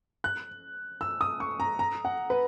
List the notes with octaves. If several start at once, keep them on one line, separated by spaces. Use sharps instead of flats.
F#6
E6
D#6
C#6
A#5
A#5
F#5
B4